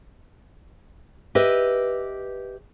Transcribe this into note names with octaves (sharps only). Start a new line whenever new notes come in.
G4 B4 D#5 E5